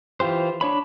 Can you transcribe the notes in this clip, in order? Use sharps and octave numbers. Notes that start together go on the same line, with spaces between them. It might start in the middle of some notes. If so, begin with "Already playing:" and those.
E3 F4 G4 C5
D4 C#5 B5